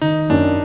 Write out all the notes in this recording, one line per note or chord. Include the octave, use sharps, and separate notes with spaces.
D#3 D#4
F#2 D4